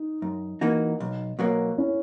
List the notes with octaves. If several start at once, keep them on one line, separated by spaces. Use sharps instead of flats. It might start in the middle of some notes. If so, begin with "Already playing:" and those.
Already playing: D#4
F#2
E3 A#3 D#4 F#4
B1
B2 F#3 A#3
C#4 E4